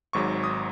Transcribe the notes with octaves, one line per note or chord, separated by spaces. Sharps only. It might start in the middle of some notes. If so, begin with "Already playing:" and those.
G#1 G#2 F#3 C#6
D#6